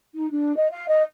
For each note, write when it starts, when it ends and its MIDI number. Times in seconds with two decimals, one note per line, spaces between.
0.15 0.28 63
0.30 0.54 62
0.57 0.68 75
0.71 0.88 77
0.89 1.03 75